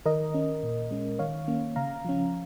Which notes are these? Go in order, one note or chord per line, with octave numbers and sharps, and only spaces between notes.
D#3 A#4 D#5
C#4
A#2
G#3 C#4
D#3 C#5 F5
A#3 C#4
C#3 F5 A#5
F3 C#4